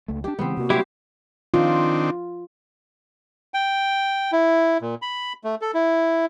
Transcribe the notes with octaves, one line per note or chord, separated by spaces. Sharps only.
C#2 A3
F#3 D4 G4
C#3 E3 G#3 B3 C4
C3 A#3 F#4
F#3 G3 E4 G4 C5
D#3 C4 D4 F4
G5
E4
A#2
B5
A3
A4
E4